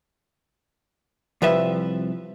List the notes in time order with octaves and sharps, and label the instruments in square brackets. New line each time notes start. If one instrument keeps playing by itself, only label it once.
[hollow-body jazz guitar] C2 F3 B4 E5